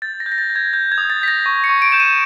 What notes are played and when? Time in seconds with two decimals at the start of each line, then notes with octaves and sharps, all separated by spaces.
0.02 G6 A6
0.20 A#6
0.26 G6
0.32 A#6
0.38 A6
0.50 G6
0.56 G#6
0.73 G6
0.92 G#6
0.98 D#6
1.10 A6
1.21 G6 B6
1.28 A#6
1.46 C#6
1.64 C#7
1.69 C#6
1.82 D7
1.92 G6 E7
2.00 D#7